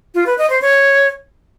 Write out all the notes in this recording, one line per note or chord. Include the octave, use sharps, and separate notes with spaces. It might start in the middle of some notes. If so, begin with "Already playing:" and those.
F4
B4
D#5
C5
C#5